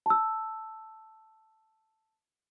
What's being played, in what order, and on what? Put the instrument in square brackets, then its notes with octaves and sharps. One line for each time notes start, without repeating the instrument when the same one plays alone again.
[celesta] A5 E6